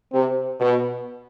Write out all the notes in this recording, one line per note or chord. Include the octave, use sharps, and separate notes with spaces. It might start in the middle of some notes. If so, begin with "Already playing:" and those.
C3
B2